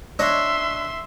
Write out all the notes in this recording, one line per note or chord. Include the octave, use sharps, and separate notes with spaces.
D4 C#5 D#5 E5 C6